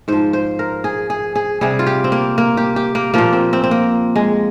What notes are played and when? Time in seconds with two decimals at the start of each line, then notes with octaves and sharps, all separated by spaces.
0.08 G#2 F3 C5
0.33 C5
0.59 A#4
0.84 G#4
1.10 G#4
1.35 G#4
1.61 C3 G3 G#4
1.79 F4
1.87 G4
2.04 C4
2.12 A#3
2.38 A#3
2.57 G4
2.76 G4
2.95 A#3
3.14 A#2 F3 A#3
3.33 C4
3.53 C4
3.64 C4
3.71 A#3
4.16 G#3